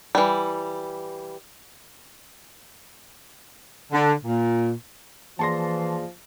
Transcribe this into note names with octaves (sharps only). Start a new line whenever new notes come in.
E3 G3
D3
A#2
E3 F3 A#3 G#4 D5 A5 C6 A#6